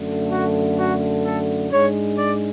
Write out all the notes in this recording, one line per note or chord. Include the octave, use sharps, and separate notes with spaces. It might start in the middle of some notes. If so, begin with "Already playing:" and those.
Already playing: F#2 D3 A3
F#4
F#4
A4
G#2 G#3 D4 C#5
D5